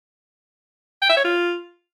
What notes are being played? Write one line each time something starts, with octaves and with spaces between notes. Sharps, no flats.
G5
E5
C#5
F4